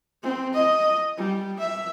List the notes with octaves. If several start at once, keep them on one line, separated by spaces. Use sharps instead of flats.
C4
D#5
G3
E5